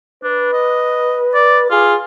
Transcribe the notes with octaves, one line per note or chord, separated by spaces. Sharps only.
D4 B4
D#5
D5
F4 G#4